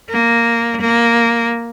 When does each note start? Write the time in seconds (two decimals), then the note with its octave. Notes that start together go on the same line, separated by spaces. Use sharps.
0.10 A#3
0.81 A#3